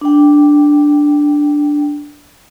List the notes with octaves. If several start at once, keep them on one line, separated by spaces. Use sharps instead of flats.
D4 G5